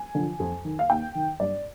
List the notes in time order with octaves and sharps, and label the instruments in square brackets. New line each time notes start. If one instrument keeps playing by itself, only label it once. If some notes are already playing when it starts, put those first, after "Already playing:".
Already playing: [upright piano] G#5
D3 F3
F2
D#3
F5
D#2 G5
D#3
G2 D5